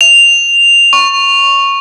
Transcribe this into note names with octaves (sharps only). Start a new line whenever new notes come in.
F7
C#6